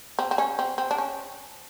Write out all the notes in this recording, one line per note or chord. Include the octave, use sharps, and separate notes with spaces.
C4
C4
C#4
C4
C4
D4
C#4